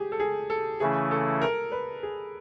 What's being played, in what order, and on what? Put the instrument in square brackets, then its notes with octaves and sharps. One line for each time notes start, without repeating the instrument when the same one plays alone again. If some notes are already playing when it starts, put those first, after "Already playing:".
Already playing: [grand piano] G4 G#4
A4
G#4
A4
[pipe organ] C#3 E3 A3 C#4 E4 [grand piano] G#4
[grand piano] A4
A#4
B4
G#4